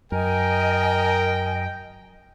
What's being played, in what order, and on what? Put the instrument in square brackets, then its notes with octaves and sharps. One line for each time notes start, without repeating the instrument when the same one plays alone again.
[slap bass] F#2 [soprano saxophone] A#4 [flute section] D#5 G#5 [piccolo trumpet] G5